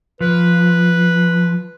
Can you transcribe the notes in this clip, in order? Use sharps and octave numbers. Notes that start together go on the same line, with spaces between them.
F3 B4